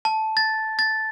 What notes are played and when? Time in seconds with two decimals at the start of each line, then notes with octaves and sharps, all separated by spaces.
0.05 A5
0.37 A6
0.79 A6